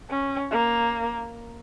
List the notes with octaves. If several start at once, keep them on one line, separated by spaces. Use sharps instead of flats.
C#4
A#3